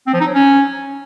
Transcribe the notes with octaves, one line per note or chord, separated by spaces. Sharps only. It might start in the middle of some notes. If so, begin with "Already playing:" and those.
C4
F3
D#4
F#3
C#4